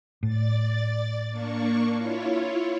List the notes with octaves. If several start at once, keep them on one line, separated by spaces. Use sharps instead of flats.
A2 D5 A6
A#3 D4 C#6
E4 F4 C#5